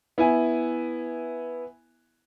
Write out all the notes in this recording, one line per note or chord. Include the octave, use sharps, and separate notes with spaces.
B3 E4 E5 G#5